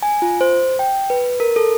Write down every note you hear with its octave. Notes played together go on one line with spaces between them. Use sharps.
G#5
F4
C5
G5
B4
A#4
A4